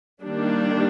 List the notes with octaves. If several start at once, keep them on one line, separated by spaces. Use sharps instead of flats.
D#3 G3 A#3 D4